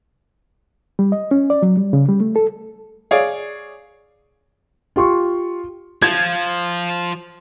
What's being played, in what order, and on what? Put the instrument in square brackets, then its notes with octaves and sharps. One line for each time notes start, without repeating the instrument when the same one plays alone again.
[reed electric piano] G3
D#5
C#4
D5
F#3
G3
C#3
G3
A3
A4
[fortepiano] G#4 C#5 D5 F5
[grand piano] F4 G4 C6 C#6
[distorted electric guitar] F3 [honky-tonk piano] G#6